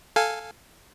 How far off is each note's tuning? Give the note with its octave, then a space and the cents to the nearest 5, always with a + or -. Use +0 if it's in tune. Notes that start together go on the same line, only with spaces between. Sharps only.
A4 +0 F5 +0 G#5 -10